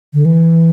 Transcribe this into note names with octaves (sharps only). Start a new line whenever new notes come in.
D3
E3